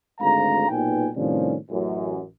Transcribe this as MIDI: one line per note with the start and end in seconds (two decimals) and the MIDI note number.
0.21 0.69 32
0.21 0.69 38
0.21 0.69 56
0.21 0.69 77
0.21 0.69 82
0.69 1.07 35
0.69 1.07 46
0.69 1.07 63
0.69 1.07 71
0.69 1.07 79
0.69 1.07 80
1.15 1.55 45
1.15 1.55 48
1.15 1.55 51
1.15 1.55 53
1.15 1.55 55
1.15 1.55 61
1.70 2.22 33
1.70 2.22 42